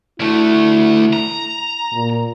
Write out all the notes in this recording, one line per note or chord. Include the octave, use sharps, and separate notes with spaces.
D2 A3 E4
A#5
A#2